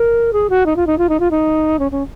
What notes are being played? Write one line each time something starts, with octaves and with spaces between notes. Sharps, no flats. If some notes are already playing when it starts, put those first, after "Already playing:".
Already playing: A#4
G#4
F#4
D#4
F4
D#4
F4
D#4
F4
D#4
C#4
C#4